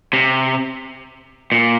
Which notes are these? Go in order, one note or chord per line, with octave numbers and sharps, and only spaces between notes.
C3
A#2